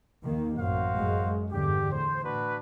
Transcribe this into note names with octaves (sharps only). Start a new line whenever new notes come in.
D#2 D#3 A#3
A1 F#2 F#4 C5 F5
F#2 G#3
E2 G2 D3 G4
A2 C5
D4 F#4 B4